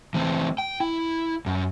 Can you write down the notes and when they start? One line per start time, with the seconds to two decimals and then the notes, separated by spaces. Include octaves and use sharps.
0.14 E3 A3 C4
0.58 G5
0.80 E4
1.46 F#2